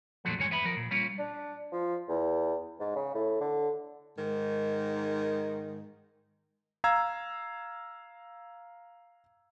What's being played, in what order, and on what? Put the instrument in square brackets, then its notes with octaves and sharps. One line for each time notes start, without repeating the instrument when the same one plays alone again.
[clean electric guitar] F2 A#2 D3 F3 F#3 A3
D2 G2 D#3 G#3 C#5 G#5
E2 B3 E5 B5
F3 A#4
A#2
G3 A#3 C#4 F4
[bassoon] D4
F3
E2
G#2
C#3
A2
D3
[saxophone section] G#2 D#3
[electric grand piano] F5 A#5 E6 G#6